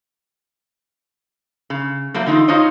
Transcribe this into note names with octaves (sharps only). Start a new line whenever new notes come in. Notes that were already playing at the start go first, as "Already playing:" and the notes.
C#3
F#3 G3 A3 A#3
D3 E3 D#4 F4
D#4 F4 F#4 C5 C#5 D#5